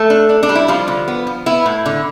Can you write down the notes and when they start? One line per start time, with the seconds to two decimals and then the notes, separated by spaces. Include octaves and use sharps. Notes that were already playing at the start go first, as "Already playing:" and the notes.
Already playing: A3 A4
0.10 D4
0.29 D4
0.43 D4
0.49 G3
0.55 E4
0.68 F3 G3 F4
0.88 D3
1.08 B3
1.27 F3
1.46 B3 E4
1.66 A2
1.86 D3